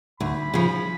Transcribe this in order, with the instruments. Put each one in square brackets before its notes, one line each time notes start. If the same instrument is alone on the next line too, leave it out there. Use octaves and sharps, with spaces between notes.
[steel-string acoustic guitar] D2 [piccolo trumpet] B5
[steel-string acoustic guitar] C#3 F3